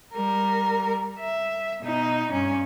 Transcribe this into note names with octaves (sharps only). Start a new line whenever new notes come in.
G3 A#4
E5
B2 D#4
G2 C#4